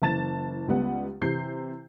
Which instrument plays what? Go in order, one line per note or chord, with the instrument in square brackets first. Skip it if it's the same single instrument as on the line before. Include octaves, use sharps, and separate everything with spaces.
[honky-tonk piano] F#1 E3 A5 A6 E7
C#2 G3 B3 F#5
C3 E3 G6 C7